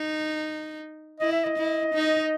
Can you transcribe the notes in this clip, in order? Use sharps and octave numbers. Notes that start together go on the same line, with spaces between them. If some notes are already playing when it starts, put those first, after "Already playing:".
Already playing: D#4
E4 D#5
E5
D#5
E4
D#4